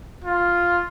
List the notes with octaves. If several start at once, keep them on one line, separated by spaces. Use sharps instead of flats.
F4